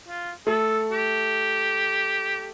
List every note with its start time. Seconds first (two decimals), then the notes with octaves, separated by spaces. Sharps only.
0.08 F4
0.47 A3 A4
0.91 G4